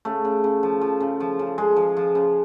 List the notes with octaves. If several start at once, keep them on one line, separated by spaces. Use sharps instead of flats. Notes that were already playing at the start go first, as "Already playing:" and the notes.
C#3 A3
C#3
C#3
F3
F3
C#3
F3
C#3
C#3 G#3
F3
F3
C#3